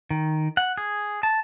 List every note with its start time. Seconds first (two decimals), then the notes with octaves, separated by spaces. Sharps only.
0.10 D#3
0.57 F#5
0.78 G#4
1.23 A5